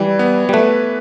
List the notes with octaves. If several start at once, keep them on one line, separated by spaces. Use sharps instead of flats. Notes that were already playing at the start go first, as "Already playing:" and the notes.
Already playing: E3 G3
B3
G3
A3 B4